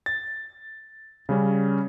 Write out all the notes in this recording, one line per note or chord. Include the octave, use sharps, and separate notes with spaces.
A6
C#3 G3 C#4